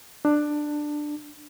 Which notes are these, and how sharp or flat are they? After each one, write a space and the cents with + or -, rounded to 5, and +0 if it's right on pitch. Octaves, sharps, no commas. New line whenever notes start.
D4 +15